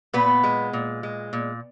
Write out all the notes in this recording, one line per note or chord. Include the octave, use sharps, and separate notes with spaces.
A#2 B3 B4
G#3
A#2
G#3
A#2